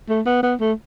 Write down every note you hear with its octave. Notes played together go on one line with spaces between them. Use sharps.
A3
B3
B3
A3